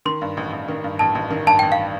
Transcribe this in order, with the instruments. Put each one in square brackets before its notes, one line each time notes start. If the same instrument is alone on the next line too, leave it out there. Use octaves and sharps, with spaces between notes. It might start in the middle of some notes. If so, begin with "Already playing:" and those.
[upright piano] D#3 [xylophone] C6
[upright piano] G2
A1
A1
D#3
G2
[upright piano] A1 [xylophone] A5
[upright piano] A1
D#3
[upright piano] G2 [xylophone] A5
[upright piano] A1 [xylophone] G5
[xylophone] F5